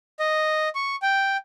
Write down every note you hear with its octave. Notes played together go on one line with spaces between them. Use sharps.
D#5
C#6
G5